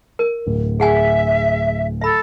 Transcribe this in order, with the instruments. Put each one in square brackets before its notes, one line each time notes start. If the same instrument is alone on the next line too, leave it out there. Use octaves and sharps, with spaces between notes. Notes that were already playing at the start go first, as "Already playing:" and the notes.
[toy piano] A#4
[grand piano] D1
[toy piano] G#4 F#5 G#5 [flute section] E5
[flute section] A4 [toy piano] E5 B5